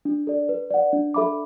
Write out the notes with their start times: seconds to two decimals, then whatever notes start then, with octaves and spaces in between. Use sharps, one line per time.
0.05 D4
0.27 A4 D5
0.49 B4
0.70 D5 F#5
0.93 D4
1.14 A4 E5 B5 D6